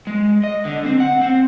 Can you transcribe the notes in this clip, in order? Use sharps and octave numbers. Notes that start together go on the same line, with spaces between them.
G#3
D#5
D3
C4
F#5
C4